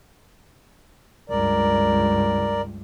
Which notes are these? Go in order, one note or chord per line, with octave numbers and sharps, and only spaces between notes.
C#2 G2 A#4 D5